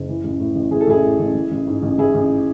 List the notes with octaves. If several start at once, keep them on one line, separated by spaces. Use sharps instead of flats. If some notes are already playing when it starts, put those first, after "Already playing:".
Already playing: F#1
E3
A1
A2
A1
E3 G#4
A4
A1 E4 G#4
A2
A1
E3
A1
G#2
A1
E3 E4 G#4
A1